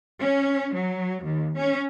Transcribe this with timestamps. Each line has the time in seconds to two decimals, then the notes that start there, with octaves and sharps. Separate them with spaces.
0.21 C#4
0.74 F#3
1.23 D#2
1.56 C#4